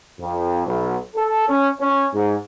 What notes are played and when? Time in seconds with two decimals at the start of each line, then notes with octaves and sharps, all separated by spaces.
0.19 F2
0.67 B1
1.15 A4
1.49 C#4
1.80 C#4
2.14 G#2